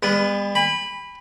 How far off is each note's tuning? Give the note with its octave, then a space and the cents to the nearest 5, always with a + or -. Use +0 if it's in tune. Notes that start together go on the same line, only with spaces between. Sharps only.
G3 +45 B3 +0
G#5 -45 B5 +0